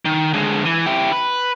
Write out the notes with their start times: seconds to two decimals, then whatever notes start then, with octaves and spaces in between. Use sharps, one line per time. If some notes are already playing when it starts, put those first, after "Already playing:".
0.05 D#3
0.34 D3 G#3
0.65 E3
0.86 E4 G4
1.12 B4